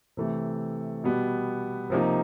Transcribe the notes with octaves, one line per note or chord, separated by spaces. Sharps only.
C3 E3 A3
B2 G3 B3
C3 F3 A#3 D#4